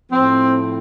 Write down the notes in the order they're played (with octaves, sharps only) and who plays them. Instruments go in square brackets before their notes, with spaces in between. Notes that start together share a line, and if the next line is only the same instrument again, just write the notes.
[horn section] A2 F3 C4